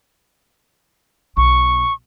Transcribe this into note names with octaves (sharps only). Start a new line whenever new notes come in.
B1 C#6